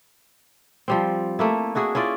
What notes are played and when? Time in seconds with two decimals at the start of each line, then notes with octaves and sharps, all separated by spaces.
0.88 F3 G3 C4
1.39 A3 A#3 E4
1.75 D4 E4 F#4 G#4
1.95 C#4 E4 F4 D5